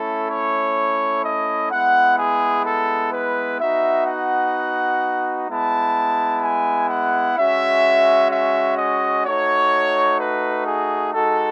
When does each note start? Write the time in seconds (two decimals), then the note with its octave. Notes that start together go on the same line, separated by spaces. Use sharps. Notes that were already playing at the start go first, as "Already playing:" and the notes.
Already playing: A3 C#4 E4 A4
0.30 C#5
1.25 D#5
1.71 G#3 B3 E4 F#5
2.19 G#4
2.66 A4
3.13 B4
3.60 B3 D#4 F#4 E5
4.07 F#5
5.48 G#3 B3 E4 A5
6.43 G#5
6.90 F#5
7.37 G#3 C#4 F#4 E5
8.31 E5
8.78 D#5
9.26 A3 D#4 F#4 C#5
10.20 B4
10.67 G#4
11.14 G#3 D#4 F#4 A4